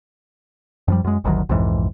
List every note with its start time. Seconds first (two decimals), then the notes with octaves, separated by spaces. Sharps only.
0.88 F#2 F3 G3
1.04 F#2 G#3
1.24 G1 D2 D#3 F#3
1.49 B1 F2 G#2 E3